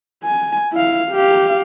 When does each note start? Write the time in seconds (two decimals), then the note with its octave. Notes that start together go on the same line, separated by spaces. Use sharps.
0.24 G#5
0.73 E4 F5
1.12 G4 F5